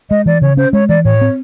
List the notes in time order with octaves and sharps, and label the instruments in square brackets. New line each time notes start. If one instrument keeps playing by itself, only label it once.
[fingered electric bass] G#3 [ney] D#5
[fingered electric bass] E3 [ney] D5
[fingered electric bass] C#3 [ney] C#5
[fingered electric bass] C#4 [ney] C5
[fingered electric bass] G#3 [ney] C#5
[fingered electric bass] E3 [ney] D5
[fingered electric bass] A2 [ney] C#5
[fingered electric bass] C4